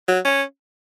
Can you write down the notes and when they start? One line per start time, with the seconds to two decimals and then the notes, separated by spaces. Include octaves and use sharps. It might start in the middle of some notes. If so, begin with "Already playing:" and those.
0.08 F#3
0.25 C#4